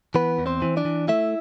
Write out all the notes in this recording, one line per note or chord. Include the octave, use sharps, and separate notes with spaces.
E3 B3 B4
E2
C4 C5
E3
D4 D5
E3
A3 E4 E5